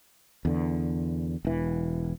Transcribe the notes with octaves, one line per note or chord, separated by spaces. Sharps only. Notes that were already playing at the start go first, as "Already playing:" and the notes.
E2 D3
E1 E3